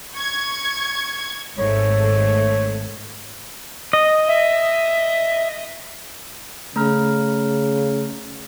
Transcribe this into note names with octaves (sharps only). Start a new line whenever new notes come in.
C#6 G#6
G#1 G#2 A3 C#5
D#5
E5
C#3 A3 A#5 F6